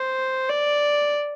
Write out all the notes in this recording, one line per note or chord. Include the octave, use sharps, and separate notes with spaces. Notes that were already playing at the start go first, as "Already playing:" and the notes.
Already playing: C5
D5